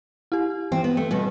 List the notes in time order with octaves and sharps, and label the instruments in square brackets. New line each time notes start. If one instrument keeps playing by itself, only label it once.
[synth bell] E4 G4
[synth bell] E3 [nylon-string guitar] C4
[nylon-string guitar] B3
A3
[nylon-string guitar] B2 B3 [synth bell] G3 C4